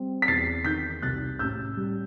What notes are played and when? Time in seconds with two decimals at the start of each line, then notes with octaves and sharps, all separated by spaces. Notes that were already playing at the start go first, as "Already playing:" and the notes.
Already playing: G3 C4
0.22 B6
0.28 E2 A6 C7
0.64 D#3 G6 B6
1.02 C2 F#6 A6
1.39 A1 E6 G6
1.77 G3